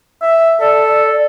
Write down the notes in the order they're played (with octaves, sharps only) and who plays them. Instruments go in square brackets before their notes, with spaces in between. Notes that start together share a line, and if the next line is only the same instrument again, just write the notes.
[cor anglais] E5
[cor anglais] A4 [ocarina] D5